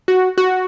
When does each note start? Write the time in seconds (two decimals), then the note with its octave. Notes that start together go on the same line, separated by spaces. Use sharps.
0.08 F#4
0.38 F#4